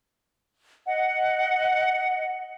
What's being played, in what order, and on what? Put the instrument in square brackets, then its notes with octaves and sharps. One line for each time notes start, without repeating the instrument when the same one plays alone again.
[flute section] D#5 F#5